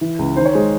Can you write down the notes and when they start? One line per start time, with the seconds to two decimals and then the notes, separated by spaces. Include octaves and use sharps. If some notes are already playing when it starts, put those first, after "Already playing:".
0.01 E3
0.19 C#2
0.36 D#3 C5
0.45 C#5
0.53 G#3 C5